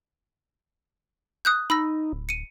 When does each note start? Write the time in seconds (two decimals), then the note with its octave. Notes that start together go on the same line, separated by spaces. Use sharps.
1.45 D#6 F#6 G6
1.70 D#4 B5 E6 A#6
2.12 D1
2.29 C#7 D#7